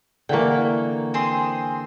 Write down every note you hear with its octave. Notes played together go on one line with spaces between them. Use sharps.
D3 E3 A#3 G5 C#6
C4 G#4 C6